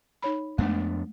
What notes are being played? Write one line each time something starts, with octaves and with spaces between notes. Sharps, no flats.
D#4 C#5 B5
F2 G#3 A3 B3 D4